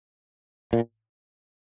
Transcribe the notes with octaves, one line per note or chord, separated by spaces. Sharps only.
A#2